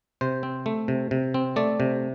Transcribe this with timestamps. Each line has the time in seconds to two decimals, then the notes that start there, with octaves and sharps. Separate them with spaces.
0.21 C3 C5
0.43 C4
0.66 A3
0.88 C3
1.11 C3
1.34 C4
1.56 A3 D5
1.80 C3